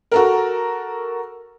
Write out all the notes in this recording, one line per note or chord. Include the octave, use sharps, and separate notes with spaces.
F#4 A4 A#4